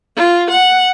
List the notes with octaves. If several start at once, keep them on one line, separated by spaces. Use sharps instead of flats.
F4
F#5